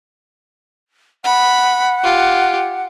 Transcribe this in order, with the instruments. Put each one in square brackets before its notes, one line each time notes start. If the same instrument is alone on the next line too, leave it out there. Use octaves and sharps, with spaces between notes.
[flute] F#5 [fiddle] B5
[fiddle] F4 G4